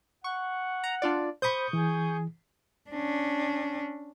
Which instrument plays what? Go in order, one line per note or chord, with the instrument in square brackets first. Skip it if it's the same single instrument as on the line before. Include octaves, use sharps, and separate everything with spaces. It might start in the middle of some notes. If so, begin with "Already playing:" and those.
[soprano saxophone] F#5 [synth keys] C#6
[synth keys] A#5
D4 F4 D5
[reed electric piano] C5 B5 [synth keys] C#6 D#6 G6
[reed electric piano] E3 [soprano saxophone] G#4
[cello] C#4 D4